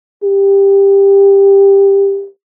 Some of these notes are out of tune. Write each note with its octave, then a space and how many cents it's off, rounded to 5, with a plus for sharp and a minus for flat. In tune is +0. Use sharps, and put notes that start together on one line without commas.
G4 +15